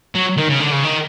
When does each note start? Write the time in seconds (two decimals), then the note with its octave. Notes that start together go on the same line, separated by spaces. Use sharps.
0.15 F#3
0.37 D#3
0.49 C#3
0.60 D3
0.71 C#3
0.84 D#3